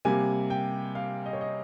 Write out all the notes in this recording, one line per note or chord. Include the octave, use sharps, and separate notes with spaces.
C3 G3 A#3 G#5
G5
F5
D#5
C#5
D#5